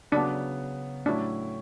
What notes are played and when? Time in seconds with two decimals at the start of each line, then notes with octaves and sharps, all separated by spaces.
0.12 C#3 F#3 B3 D4
1.06 A2 F#3 C#4 D4 E4